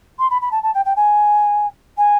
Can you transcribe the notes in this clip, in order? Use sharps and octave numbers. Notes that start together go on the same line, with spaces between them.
C6
B5
B5
A5
A5
G5
G5
G#5
G#5